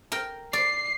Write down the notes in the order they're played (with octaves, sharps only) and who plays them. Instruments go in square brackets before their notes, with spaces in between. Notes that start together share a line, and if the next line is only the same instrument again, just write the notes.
[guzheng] A#4 G5
[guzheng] D5 [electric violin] C7